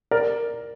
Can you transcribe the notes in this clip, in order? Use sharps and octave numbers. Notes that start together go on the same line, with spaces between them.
A#4 D5